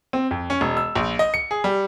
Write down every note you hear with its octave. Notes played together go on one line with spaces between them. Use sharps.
C4
F2
C#4
E1
E6
A#1
D#5
C#7
G#4
G3